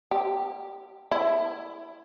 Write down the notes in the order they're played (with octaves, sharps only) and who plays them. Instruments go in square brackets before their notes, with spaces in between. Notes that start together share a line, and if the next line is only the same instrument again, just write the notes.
[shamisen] G4
E4